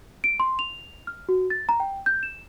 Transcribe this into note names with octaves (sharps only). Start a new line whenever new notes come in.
D7
C6
F7
F6
F#4
A6
A#5
G5
G6
E7